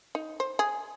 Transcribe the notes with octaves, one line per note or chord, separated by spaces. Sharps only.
D#4
C5
G#4